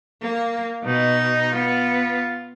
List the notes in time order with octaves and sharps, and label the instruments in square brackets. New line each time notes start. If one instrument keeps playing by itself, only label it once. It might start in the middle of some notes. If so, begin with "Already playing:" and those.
[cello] A#3
[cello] B2 [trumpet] D#4
[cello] B3 [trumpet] F4